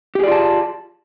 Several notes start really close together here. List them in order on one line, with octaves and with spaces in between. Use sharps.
G4 G#4 D5 F4 A5